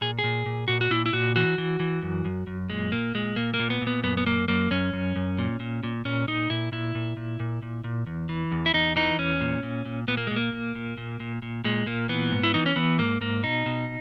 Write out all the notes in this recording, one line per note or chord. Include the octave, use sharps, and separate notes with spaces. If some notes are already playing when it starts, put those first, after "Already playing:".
A#2 G#4
G#4
A#2
A#2
A#2 F#4
F#4
A#2 E4
E4
A#2 F#4
E3 F#4
E3
E3
F#2
F#2
F#2
A#2 G#3
A#2 A#3
A#2 G#3
A#2 A#3
A#3
A#2
B3
A#2
B3
F#2 B3
B3
F#2 A#3
F#2 A#3
F#2 C#4
F#2
F#2
A#2
A#2
A#2
A#2 C#4
A#2 D#4
A#2 E4
A#2 E4
A#2
A#2
A#2
A#2
A#2
E2
E3
E2
E4
E2 D#4
E3 D#4
E2 C#4
A#2
A#2
A#2
A#2 B3
A#3
A#2 G#3
A#3
A#2
A#2
A#2
A#2
A#2
A#2 G#3
A#2 A#3
E3 B3
G#2
E4
E3 D#4
C#4
E3 B3
G#2 A#3
G#2 A#3
B2 D#4
B2